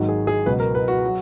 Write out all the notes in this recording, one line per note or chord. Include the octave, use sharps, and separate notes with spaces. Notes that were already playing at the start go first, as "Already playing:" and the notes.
Already playing: G#1 G#2 D#3 F#3
G#4
G#4
C#2 B2 F#3 B4
A#4
B4
F#4
F#3